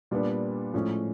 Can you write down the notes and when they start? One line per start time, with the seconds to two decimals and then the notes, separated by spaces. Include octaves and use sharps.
0.11 A#2 G3 B3 D4
0.74 A2 F3 G#3 C#4